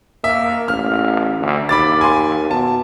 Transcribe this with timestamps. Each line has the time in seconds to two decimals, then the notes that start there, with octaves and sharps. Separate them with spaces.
0.24 A#3 E5
0.68 A1 F6
1.40 D2
1.69 D#2 B5 D6 A6
2.01 G#5 C6
2.51 B2 A5